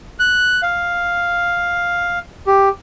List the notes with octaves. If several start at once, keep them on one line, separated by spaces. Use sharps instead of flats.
F#6
F5
G4